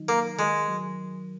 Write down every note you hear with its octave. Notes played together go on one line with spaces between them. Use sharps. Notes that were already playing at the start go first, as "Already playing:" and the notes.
Already playing: D#3 F#3 D#4
A#3 A#4
D#3 G#3
F#3